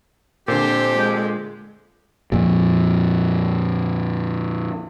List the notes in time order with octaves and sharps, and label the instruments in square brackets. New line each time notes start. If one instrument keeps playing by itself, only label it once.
[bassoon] F2 [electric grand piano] A#2 D3 [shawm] G4 [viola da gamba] C5
[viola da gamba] G#3
[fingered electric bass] F2 A#2